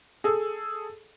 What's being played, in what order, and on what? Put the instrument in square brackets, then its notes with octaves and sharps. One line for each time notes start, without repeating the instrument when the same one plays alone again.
[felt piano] G#4 A4